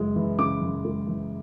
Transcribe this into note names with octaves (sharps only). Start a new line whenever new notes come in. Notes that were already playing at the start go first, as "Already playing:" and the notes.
Already playing: F#2 C#3 G#3
E3
C#3 D6
F#2
G#3
E3